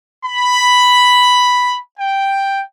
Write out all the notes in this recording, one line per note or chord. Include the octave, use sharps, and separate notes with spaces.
B5
G5